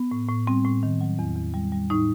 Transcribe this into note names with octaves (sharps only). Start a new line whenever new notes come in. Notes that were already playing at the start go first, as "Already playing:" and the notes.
Already playing: B3
A2
A2
G3 C4
A2
D#3
F#3
E2
E2
G3
G3
A2 D#4